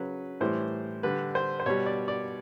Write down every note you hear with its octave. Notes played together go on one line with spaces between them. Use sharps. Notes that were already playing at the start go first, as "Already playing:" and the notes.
Already playing: C#3 F#3 B4
A2 E3 G3 C5
D3 G3 B4
C5
C5
B2 G3 C#5
D5
D5